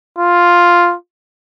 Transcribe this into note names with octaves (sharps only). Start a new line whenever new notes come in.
F4